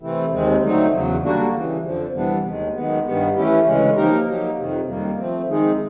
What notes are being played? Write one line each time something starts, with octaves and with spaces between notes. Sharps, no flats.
C3 E3 A3 C4 E4
D#2 D#3 G#3 C4
D3 F#3 A3 C4 D#4
E2 C#3 F#3
D3 G3 A#3 D4 F#4
C#3 E3 G3
F2 D3 F3
C3 E3 G3 B3 D4
D#2 D#3 G#3
F#2 D#3 G#3 B3
G2 D#3 G3 B3
E3 A3 C#4 E4 G4
D2 C#3 E3 G#3 C#4
F3 A#3 D#4 G4 A#4
F#3 A#3 D#4 G4
F2 C3 D#3
F#2 D#3 G3 A#3
F3 A3 C4
D#3 G#3 C4 D#4 G#4